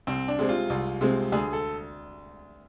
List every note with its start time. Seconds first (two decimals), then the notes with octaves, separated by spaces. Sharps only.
0.07 C2 C4
0.28 D4
0.39 C3 G#3 C4
0.49 F4
0.70 C2
1.01 C3 G#3 C4
1.32 D2 G#4
1.53 A4